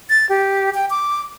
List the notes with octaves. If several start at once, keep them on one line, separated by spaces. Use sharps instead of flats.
A6
G4
G5
D6